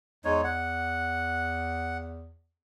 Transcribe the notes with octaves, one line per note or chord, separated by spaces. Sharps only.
E2 G#3 D#4 C#5
F#5